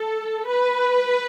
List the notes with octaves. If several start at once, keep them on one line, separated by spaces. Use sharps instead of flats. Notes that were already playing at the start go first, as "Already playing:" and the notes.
Already playing: A4
B4